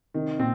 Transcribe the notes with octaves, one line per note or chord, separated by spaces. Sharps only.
C3 D#3
A#2 C4